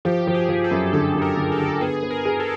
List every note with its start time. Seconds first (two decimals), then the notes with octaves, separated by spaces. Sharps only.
0.05 F3 G4
0.27 F3
0.34 G#4
0.49 F3
0.64 A4
0.71 F#2
0.93 D3 A4
1.15 F#2
1.22 A#4
1.37 D3
1.52 A4
1.59 D3
1.81 B3 G#4
2.03 B3
2.10 A#4
2.25 G#4
2.40 A4